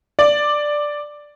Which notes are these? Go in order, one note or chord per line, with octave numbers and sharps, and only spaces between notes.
D5